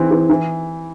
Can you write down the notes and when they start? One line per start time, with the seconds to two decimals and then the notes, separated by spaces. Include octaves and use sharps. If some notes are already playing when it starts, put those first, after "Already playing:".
Already playing: E3 C4
0.11 E3
0.30 E3